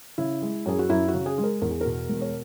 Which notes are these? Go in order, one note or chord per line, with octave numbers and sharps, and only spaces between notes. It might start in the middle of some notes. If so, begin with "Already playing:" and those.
C#3 E4
G#3
F#2 G#4
F#4
F#2 E4
F#4
C#3
G#4
G#3
A#4
E2 A#4
G#4
B2 A#4
E1
C#5